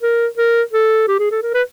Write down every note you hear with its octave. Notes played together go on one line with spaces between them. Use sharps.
A#4
A#4
A4
G4
G#4
A4
A#4
B4